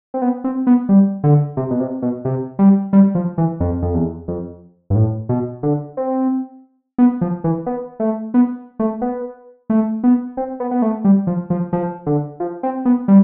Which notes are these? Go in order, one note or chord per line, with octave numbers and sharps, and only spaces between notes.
C4
B3
C4
B3
G3
D3
C3
B2
C3
B2
C3
G3
G3
F3
E3
F2
F2
E2
F2
G2
A2
B2
D3
C4
B3
F3
E3
B3
A3
B3
A3
B3
A3
B3
C4
B3
B3
A3
G3
F3
F3
F3
D3
F3
C4
B3
G3